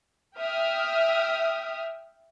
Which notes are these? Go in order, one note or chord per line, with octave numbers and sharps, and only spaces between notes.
E5 G5 D#6 F6